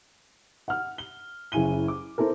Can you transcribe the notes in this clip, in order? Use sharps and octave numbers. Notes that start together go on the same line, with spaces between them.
F#5 F6
G7
F#1 C#3 E4 G#5 D#7 G7
D6
C4 E4 A4 A#4